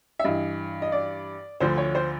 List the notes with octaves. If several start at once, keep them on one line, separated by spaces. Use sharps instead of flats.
E5
G2 E3 D#5
D#5
D5
D2 D3 F3 C5
C#5
C5